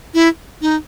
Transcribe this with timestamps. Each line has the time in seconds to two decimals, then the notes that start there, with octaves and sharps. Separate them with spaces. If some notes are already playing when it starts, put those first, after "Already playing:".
0.14 E4
0.61 D#4